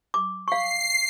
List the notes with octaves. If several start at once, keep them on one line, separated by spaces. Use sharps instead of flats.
D6
F5 C#6 C7